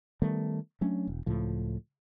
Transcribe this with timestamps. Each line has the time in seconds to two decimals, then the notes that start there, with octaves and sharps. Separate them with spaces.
0.22 D#3 G3 A3 B3
0.81 F#3 A3 C#4 D4
1.07 E1
1.26 C#2 A2 F3